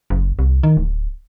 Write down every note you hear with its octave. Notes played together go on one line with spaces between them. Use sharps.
F#1
C2
D#3
D1